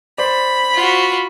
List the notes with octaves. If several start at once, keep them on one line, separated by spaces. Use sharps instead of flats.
C5 D5 B5
F4 F#4